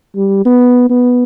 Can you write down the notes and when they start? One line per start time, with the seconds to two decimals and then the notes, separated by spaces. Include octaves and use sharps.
0.16 G3
0.45 B3
0.90 B3